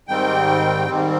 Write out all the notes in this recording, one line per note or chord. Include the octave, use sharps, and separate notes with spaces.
G#2 D#3 G3 C4 G5
G#2 D#3 G3 C4